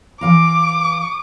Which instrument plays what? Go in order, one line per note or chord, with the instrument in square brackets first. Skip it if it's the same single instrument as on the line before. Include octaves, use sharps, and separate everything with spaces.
[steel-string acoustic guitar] E3 F5 A#5 [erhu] D6